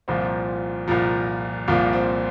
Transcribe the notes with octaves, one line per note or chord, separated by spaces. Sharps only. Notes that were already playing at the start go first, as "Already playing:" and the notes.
C2 A#2 F3 C4
C2 A#2 F3
C2 A#2 F3 A#3
C4